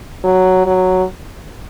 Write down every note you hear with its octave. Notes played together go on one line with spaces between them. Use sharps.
F#3
F#3